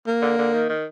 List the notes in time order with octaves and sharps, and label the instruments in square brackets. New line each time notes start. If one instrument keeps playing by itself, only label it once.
[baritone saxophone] A#3
[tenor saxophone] D3
D3
D#3
D#3